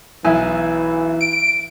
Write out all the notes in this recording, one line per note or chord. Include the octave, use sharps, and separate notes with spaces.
B1 E3 E4 G#5
D7